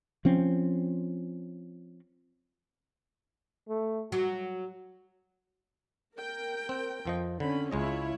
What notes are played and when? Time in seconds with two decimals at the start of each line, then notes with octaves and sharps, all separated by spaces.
0.25 F3 C4 C#4
3.69 A3
4.12 F#3 F#4
6.15 A#4 G5
6.69 C4
7.05 F2 F3 D#5
7.40 D3 C4 C#4 B5
7.71 C#2 G#3 E4 F4 C#5 D#5